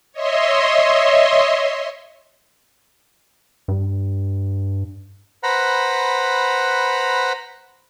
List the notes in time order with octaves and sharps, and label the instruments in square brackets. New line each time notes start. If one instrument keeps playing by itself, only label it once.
[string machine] C#5 D#5 E5 C6
[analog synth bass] G2
[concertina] B4 C5 F#5 A#5 B5